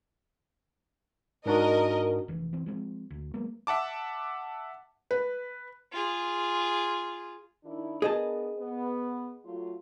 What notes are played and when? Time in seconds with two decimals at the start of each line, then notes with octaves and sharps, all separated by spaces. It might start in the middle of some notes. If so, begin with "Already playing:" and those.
1.46 G#2 D4 F#4 A#4 D#5
2.28 F1 E3
2.53 E3 C4
2.66 F3 G#3 B3 C4
3.11 D2
3.34 F#3 G#3 A#3 B3
3.67 E5 F#5 A5 D6
5.11 B4
5.93 F4 G#4
7.64 D#3 D4 E4
8.02 B3 D4 G#4 A#4 D#5 A5
8.58 B3
9.45 F#3 A3 F4